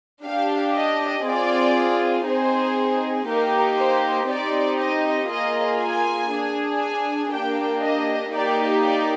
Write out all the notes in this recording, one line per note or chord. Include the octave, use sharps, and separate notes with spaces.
D4 G4 F5
D#5
C4 F4 G#4 D5
C4 D#4 G#4 C5
A#3 D#4 G4 A#4
C5
C4 D#4 G4 D5
D#5
A#3 F4 G#4 D#5
G#5
D4 G#4
G#5
A#3 D4 G4 G5
D#5
A#3 D#4 G4 D5
D5